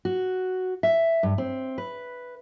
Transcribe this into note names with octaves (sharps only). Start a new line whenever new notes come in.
F#4
E5
G2
C4
B4